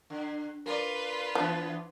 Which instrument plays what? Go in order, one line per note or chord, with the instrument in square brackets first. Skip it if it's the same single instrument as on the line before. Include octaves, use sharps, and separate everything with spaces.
[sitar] D3
[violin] F4 B4 [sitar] A#4 D5
[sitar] E3 B3 D4 [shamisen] F3